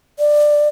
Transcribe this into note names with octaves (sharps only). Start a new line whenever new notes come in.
D5